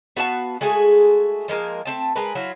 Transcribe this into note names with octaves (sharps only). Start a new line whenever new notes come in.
B3 F#4 F5 A5
G#3 A3 F#4 G#4
F3 G#3 A#3 A#4
A3 C4 A5
G#3 A#4 B4
F#3 E4 F4